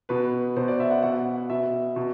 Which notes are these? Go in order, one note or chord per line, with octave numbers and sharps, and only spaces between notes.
B2 B4
B2 C5
D5
E5
F#5
B2 F#5
B2 E5
B2